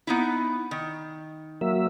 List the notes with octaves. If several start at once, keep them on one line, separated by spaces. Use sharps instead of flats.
B3 D#4 E4
D#3
F#3 A#3 E5